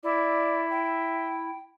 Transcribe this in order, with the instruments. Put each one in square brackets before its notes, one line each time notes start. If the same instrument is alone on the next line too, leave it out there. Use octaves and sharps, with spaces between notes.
[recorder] E4 [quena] D5
[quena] G5